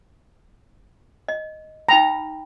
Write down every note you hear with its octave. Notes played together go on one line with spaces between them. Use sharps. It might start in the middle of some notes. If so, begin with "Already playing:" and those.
D#5
D#4 G5 A#5 B5